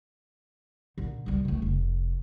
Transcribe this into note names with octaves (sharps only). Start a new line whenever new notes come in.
A#2 D3
C#2 G3
C#2 A3
F1